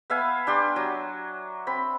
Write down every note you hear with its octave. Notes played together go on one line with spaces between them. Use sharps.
B3 E5 F5 G#5
D4 G4 C6
F#3
C4 B5